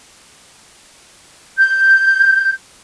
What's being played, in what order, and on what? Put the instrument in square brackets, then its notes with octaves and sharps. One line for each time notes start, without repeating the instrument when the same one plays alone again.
[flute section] G6